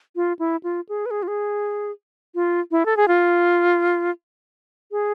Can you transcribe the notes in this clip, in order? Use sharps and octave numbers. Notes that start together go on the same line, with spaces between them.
F4
E4
F4
G#4
B4
G#4
F4
G#4
F4
E4
A4
G#4
F4
G#4